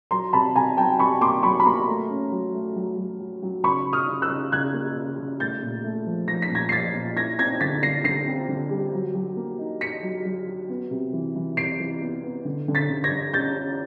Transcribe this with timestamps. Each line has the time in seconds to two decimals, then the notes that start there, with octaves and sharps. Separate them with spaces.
0.11 F#3 A#5 C6
0.33 C3 A5 B5
0.56 C3 G#5 A#5
0.77 F#3 G5 A5
0.99 C3 B5 C#6
1.21 A#3 C6 D6
1.43 F#3 B5 C#6
1.60 B5
1.65 A#3 A#5 C6
1.88 A3
2.10 C#4
2.32 F#3
2.54 A3
2.76 F#3
2.97 F#3
3.20 F#3
3.42 F#3
3.63 C#3 B5 C#6
3.86 C#3
3.93 D#6 F6
4.08 C#3
4.22 E6 F#6
4.30 C#3
4.52 C#3 F#6 G#6
4.74 A#3
4.96 C#3
5.19 C#3
5.40 A3 G6 A6
5.62 A#2
5.84 A3
6.06 F3
6.28 F3 A#6
6.42 B6
6.50 A#2
6.55 G#6 A#6
6.69 C7
6.72 F3 A6 B6
6.95 A#2
7.16 E4 G#6 A#6
7.39 C4 G#6 A#6
7.61 D3 A6 B6
7.83 D3 A#6 C7
8.04 D3 A#6 C7
8.26 C4
8.48 D3
8.70 G3
8.93 F#3
9.15 F#3
9.37 A#3
9.59 D#4
9.81 D#4 B6 C#7
10.03 F#3
10.25 F#3
10.47 F#3
10.69 B3
10.91 C3
11.13 E3
11.35 E3
11.57 C3 C7 D7
11.80 E3
12.01 B3
12.23 B3
12.45 D3
12.68 D3
12.75 A6 B6
12.90 D3
13.04 G#6 A#6
13.11 D3
13.33 C#4 G6 A6
13.56 C#4